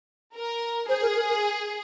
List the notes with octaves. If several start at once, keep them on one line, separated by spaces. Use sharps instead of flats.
A#4
G#4 C5
A#4
A#4
A#4